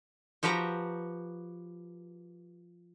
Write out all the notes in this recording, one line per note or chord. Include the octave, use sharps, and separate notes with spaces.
F3 F#4 G4 B4 A#5